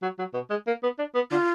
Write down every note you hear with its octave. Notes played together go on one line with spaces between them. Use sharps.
F#3
F#3
B2
G#3
A#3
B3
D4
B3
D3 F4